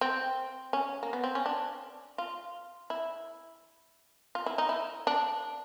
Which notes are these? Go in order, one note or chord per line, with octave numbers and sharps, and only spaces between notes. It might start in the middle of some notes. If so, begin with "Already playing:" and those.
C4
C#4
A#3
B3
C4
C#4
D4
F4
E4
F4
E4
D#4
E4
D4